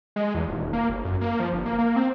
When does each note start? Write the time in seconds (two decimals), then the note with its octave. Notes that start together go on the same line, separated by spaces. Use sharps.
0.16 G#3
0.35 E2
0.48 D#1
0.73 A#3
0.89 G1
1.05 F#2
1.21 A#3
1.40 F3
1.53 G1
1.66 A#3
1.78 A#3
1.96 C4